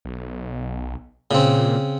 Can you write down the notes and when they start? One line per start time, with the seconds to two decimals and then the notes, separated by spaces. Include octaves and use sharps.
0.05 B1
1.31 A#2 C#3 C4